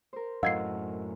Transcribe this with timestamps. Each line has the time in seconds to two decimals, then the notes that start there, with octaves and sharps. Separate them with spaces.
0.13 A#4 C5
0.43 F#2 A2 D#5 F5 F#5 E6 G#6 C7